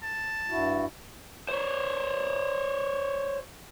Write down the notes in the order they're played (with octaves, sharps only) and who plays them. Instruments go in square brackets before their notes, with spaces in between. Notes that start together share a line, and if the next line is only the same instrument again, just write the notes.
[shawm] A5
[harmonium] G2 E4 F#4
[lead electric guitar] C5 C#5